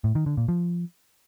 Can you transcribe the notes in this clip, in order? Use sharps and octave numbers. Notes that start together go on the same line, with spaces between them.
A2
D#3
D3
A#2
F3